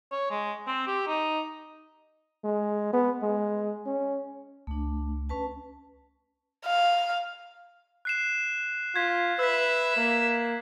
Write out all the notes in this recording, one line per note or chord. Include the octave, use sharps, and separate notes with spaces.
C#5
G#3
C4
G4
D#4
G#3
B3
G#3
C#4
C#2 A3 D4
C#4 B4 A5
F5
F#6 C7 E7
F4 G#6 B6
B4 E5 E6 B6
A#3